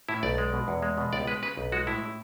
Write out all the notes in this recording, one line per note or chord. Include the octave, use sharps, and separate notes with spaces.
A2 E4
B1 D5
G#3
B2
E2
G#3
B2
C#2 D5
G#3 B4
C#3 B4
B1
G#3 F#4
A2 E4